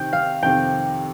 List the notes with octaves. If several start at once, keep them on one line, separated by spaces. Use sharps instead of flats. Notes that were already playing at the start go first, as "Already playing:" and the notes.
Already playing: C3 D#3 C4 D#4 G5
F5
F2 C3 D#3 C4 G5